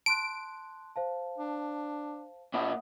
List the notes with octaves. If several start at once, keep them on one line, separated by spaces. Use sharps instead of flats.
A5 C6 F#6 D7
C5 F5 A5
D4
A#2 E5 F#5 B5 D#6